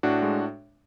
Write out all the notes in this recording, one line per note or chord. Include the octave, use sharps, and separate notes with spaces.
A2 D4 F#4
G#3